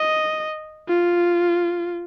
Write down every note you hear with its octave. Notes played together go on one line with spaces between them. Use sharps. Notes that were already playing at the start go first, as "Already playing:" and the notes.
Already playing: D#5
F4